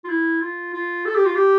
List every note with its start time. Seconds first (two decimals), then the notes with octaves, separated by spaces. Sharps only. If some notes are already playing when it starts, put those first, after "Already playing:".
0.04 F4
0.09 E4
0.42 F4
0.74 F4
1.05 A4
1.15 G4
1.26 F4
1.35 G4